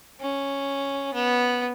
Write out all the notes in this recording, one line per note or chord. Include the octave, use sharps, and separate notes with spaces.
C#4
B3